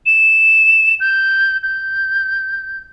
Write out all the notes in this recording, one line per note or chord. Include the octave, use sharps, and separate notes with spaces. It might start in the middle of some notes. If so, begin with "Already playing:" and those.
E7
G6
G6